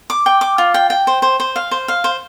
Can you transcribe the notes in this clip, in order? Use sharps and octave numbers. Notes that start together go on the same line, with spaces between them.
D6
G5
D6
F4
G5
G5
C5
C5
C5
F5
C5
F5
C5